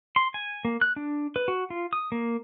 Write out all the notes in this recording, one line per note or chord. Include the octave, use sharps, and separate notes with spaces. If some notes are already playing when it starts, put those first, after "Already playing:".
C6
G#5
A#3
F#6
D4
B4
F#4
F4
D#6
A#3